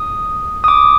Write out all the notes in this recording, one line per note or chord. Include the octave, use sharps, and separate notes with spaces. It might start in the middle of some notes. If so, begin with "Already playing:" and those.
Already playing: D#6
D#6
D6